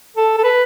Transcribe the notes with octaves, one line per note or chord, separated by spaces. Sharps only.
A4
A4
B4